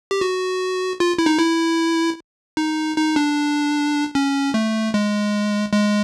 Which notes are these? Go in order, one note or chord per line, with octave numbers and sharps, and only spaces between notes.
G4
F#4
F4
E4
D#4
E4
D#4
D#4
D4
C#4
A3
G#3
G#3